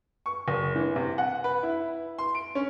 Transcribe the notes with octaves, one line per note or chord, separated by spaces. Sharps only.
C#6
F#1
E3
C3
F#5
B4
E4
C6
D7
C#4